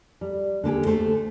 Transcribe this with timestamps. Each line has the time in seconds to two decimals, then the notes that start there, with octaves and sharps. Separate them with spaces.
0.21 G3
0.64 D3 A#3 G4 G#4
0.86 A3 C5